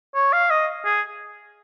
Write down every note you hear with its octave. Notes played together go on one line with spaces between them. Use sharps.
C#5
F5
D#5
G#4